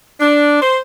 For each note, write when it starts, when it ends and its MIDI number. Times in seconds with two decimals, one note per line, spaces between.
0.20 0.61 62
0.62 0.78 72